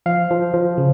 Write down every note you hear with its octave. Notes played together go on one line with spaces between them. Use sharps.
F3 F5
F3
F3
C#3